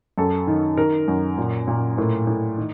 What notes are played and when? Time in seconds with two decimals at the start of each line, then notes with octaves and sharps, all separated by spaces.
0.18 F#2 A4
0.47 D#3
0.77 D#3 A#4
1.08 F#2
1.38 A#2
1.68 A#2
1.97 A2 A#4
2.27 A2
2.57 D#3